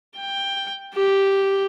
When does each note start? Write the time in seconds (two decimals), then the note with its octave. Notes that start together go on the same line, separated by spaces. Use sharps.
0.17 G5
0.94 G4